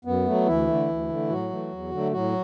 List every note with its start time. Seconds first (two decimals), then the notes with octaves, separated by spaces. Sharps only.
0.05 F#2 B3
0.26 F#3 A3
0.46 D2 E3 E4
0.67 D3 A3
0.88 D2
1.08 D3 A3
1.29 A2 F#3 F#4
1.50 E3 A3
1.71 E2
1.91 D3 F#3 A3
2.12 A2 F#3 F#4